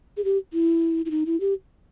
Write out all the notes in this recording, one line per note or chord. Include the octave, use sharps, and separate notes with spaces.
G#4
G4
E4
E4
D#4
E4
G4